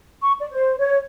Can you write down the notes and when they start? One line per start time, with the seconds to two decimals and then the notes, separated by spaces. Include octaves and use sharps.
0.22 C#6
0.39 D5
0.52 C5
0.79 C#5